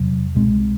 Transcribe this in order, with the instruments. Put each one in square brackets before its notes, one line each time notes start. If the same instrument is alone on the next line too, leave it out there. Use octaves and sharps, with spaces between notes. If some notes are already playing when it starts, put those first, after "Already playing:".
Already playing: [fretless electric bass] E2 C3 F#3
C2 B2 G#3 C4